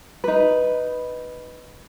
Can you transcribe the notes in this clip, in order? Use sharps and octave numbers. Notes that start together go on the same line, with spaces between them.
D#4 B4